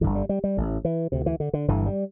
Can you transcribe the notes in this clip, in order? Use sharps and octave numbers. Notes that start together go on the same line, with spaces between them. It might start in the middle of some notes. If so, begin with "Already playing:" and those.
G1 G2 D3 E3
G3
G3
G3
A1 A2
E3
D2 C3
E3
D3
D3
G1 G2 D3 E3
G3